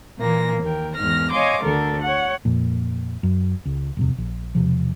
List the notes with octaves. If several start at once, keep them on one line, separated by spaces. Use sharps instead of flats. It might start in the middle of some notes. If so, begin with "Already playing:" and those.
A#2 E3 A#3 A#6
D#2 A#4 G5
E2 G#2 D#3 F6 A#6
C#5 D#5 F5 G#5 C6 D6
D2 D3 A4 A#4
C#5 F#5
F2 A#2
F#2
C#2
D#1 F2 C3
A#1
E1 A#1 C3 F3